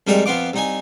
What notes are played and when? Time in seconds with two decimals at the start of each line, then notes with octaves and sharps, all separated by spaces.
0.07 F2 D#3 G3 G#3 E5 A#5
0.26 F2 B3 F4 D6
0.53 C2 D#4 G#5